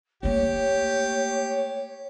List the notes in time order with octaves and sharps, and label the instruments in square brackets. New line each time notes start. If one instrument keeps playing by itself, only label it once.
[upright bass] A3 A#3 [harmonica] G4 [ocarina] C#5